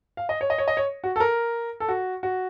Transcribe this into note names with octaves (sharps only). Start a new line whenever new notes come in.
F5
D#5
C#5
D#5
C#5
D#5
C#5
F#4
A4
A#4
A4
F#4
F#4